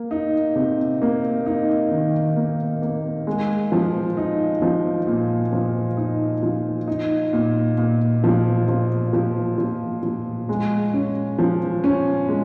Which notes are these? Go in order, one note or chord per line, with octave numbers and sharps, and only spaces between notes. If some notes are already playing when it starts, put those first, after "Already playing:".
Already playing: A#3
D#4
C3
A#3
D#4
D#3
A#3
A#3
G#3
F3
D#4
F3
A#2
F3
D#4
F3
D#4
A#2
A#2
F3
F3
F3
F3
F3
G#3
C#4
F3
C#4
G#3